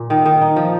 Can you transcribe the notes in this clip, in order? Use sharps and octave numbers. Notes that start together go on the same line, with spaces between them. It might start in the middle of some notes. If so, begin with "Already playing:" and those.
Already playing: A#2
D#3
D#3
D#4
F3